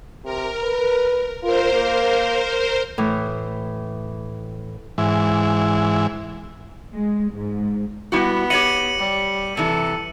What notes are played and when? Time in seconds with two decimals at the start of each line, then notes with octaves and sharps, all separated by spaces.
0.25 C3 A#4
0.63 B4
1.43 F4 A#4 C5
1.72 A#3
2.98 A2 E3
4.98 G#2 E3
6.93 G#3
7.33 G#2
8.12 G3 B3 E4 F#4
8.50 G4 C#5 D#5 C#7 D#7 F#7
8.99 G3
9.57 C3 E3 A4